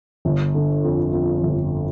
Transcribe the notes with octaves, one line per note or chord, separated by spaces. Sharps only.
G1
D3
F2
F2
G1